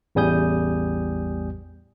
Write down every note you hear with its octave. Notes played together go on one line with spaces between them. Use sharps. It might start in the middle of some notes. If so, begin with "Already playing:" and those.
A1 E2 G3 G#5 D#6 G6